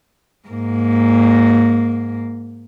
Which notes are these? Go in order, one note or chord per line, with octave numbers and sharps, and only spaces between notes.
G#2 A#3